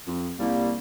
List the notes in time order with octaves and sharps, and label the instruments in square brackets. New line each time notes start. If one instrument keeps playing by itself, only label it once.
[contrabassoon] F2
[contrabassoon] C2 [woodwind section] G3 A#3